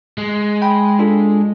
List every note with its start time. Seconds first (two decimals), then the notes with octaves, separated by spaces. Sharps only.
0.18 G#3
0.62 G5 B5
0.99 D4 F4 A4